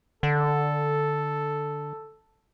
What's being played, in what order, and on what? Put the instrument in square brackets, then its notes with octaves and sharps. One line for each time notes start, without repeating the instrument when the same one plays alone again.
[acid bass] D3 [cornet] A4